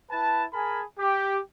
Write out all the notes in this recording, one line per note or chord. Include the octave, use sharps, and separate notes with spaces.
E4 B4 A5
G#4 A#4 G#5 A5 B5
G4